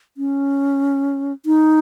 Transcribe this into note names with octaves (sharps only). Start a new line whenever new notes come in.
C#4
D#4